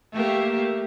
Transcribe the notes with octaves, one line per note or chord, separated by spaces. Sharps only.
A3 A#3 G4